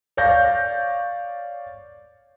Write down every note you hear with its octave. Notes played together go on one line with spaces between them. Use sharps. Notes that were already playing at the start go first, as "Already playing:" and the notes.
C#5 D5 F5 G6 A#6